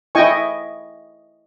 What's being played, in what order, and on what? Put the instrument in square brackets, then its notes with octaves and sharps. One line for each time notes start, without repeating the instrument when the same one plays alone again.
[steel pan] E4 D#5 G5 G#5 C#6